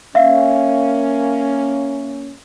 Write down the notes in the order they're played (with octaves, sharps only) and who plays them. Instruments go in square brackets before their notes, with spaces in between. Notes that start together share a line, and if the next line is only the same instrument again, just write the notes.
[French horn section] A#3 C#4 [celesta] E5 F5